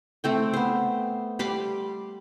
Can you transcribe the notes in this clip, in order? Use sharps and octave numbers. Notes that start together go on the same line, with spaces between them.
A3 C4 G5
B3 C5
G3 B5 C6 D6